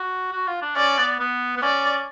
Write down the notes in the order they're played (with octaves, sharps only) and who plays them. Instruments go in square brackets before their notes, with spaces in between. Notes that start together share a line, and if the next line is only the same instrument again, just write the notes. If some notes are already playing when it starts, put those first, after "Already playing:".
Already playing: [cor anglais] F#4
F#4
F4
D4
[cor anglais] C#4 [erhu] D5
[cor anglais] B3
B3
B3
[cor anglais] C#4 [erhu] D5